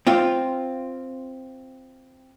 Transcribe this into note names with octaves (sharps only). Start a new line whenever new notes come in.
C4 F4